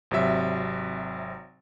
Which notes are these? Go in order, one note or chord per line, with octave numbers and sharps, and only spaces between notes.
G#1 C3 F#3 E5